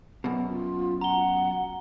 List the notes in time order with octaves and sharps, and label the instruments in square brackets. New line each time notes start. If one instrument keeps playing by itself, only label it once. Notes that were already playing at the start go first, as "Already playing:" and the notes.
[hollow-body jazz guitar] F#2 B2
[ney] F4
[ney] F#5 [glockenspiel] A#5 G7